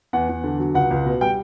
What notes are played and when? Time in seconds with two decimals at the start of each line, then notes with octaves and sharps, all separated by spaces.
0.13 E2 F#5
0.29 E2
0.44 D3
0.60 F#3
0.74 C#2 F#5
0.91 C#2
1.06 B2
1.21 G3 G5